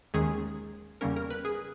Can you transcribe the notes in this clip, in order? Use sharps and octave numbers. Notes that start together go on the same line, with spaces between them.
D#2 D#3 G#3 C#4 G#4
E2 C#3 G3 A#3 C#4 A#4
A#4
B4
G#4